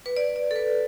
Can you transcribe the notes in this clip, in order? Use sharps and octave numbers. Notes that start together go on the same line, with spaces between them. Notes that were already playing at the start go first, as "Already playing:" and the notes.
B4
D5
D5
A4
B4